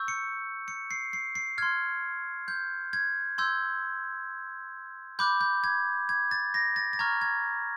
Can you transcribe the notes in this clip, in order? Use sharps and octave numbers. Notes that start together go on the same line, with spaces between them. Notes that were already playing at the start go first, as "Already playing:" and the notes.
Already playing: C#6 E6 G6
C#7
C#7
C7
C7
C7
C6 F6 G#6
G6
G#6
C6 E6 G6 G#6
B5 D6 F#6 G6
G6
G#6
G#6
A6
A#6
A6
A6
A#5 C#6 F6 G#6
G#6